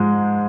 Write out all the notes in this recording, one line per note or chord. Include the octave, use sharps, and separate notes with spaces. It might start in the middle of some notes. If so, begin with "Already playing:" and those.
Already playing: G#2 F3 G#3